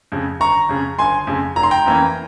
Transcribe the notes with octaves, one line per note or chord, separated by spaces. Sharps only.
F2 C#3
G1 A#5 C#6
F2 C#3
G1 G#5 C6
F2 C#3
F1 A#5
C6
G5 A#5
F2 E3 A#3 C#4